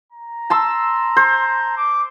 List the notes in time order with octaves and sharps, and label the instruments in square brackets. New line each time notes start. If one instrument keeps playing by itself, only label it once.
[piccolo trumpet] A#5
[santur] A5 C6 E6
C5
[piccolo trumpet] D6